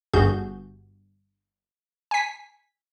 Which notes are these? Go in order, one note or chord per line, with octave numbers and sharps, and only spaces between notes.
G1 G2 F#4 G#4 G6
G#5 B6